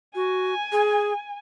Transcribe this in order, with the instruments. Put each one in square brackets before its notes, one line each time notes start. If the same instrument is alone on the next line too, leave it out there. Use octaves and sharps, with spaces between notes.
[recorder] F#4 [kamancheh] G#5
[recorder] G#4